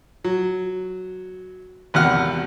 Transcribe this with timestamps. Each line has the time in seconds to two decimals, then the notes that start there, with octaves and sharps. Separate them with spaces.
0.25 F#3
1.94 G#1 E2 C3 F#5 F6